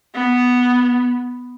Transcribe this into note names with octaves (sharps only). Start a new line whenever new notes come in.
B3